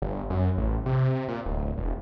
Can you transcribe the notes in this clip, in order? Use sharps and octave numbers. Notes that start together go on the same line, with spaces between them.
G1
F#2
A1
C3
A#2
D1
E1